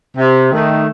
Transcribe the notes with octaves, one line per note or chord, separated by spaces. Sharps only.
C3
D#3 A3